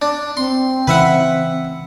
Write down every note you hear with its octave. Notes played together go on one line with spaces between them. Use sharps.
D4
C4 C6
C#3 E3 B4 E5 F#5